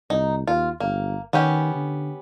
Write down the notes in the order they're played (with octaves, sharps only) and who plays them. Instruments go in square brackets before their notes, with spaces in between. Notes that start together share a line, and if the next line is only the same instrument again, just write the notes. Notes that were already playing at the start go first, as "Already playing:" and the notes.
[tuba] C2 [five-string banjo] D#4
[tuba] D#2 [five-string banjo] F4
[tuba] G1 [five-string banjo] A#3
[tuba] D#3 [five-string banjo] B3 C#4 G4
[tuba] D3